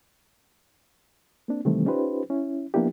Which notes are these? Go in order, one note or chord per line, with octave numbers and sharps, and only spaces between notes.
A#3 C4 D4
C3 D#3 E3 G3 A3 C4
C#4 D#4 F4 G4 B4 C5
C#4 E4
F3 A#3 B3 D4 E4 G4